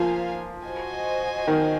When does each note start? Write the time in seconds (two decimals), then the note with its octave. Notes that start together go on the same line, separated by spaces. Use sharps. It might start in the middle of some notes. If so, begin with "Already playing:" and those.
Already playing: F3 A#3 F4 C5 F5 G#5
0.64 F#4 C5 D#5 G#5
1.47 D#3